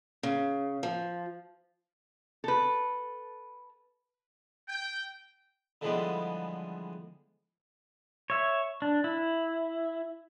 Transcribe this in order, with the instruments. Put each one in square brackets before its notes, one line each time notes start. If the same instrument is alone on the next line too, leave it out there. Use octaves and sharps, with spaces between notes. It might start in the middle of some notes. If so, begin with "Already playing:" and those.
[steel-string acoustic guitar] C#3
F3
[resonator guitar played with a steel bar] A4 B4
[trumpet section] G5
[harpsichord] D3 E3 F3 G3 G#3 B3
[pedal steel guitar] C#5 E5
D4
E4